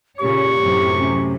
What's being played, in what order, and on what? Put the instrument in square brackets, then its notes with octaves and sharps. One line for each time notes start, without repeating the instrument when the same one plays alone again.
[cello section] A#2 C#3 C#5 [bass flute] G4 [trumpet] C#6
[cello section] F#2 A2 C3
[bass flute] C#4